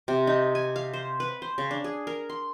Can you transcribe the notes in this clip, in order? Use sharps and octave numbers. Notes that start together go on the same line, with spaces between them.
C3
D#4
G#5
F5
C5
B4
C5
C#3
D4
G#4
A#4
C6